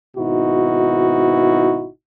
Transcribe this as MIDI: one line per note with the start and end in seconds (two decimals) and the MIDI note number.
0.17 1.88 32
0.17 1.88 47
0.17 1.88 63
0.17 1.88 64
0.17 1.88 66